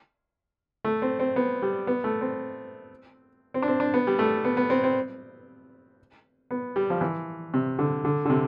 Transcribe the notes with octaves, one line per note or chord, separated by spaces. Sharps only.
A3
C4
C4
B3
G3
B3
A3
C4
C4
D4
C4
D4
B3
G3
A3
B3
B3
C4
C4
B3
G3
F3
E3
C3
D3
D3
D3
C3